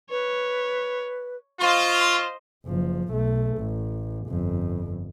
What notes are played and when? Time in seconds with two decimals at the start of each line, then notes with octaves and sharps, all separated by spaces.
0.10 B4 C#5
1.60 F4 C5 D#5 C#6
2.65 F#1 F3
3.09 B1 A3
3.58 A1
4.27 G1 F2